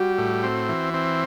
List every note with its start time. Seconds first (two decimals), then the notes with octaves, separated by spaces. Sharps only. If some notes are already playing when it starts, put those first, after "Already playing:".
Already playing: G3 F#4
0.18 A2
0.43 C4
0.69 E3
0.94 C4